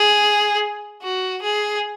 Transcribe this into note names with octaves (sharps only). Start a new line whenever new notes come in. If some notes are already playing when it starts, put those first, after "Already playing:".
Already playing: G#4
F#4
G#4